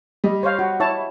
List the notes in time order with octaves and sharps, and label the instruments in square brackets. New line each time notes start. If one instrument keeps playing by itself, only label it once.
[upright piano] G3 D#5
[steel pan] C5 C#5 F5
F#4
E4 C#5 A5